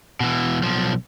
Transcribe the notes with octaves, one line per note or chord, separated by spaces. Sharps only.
B2 E3
B1 F3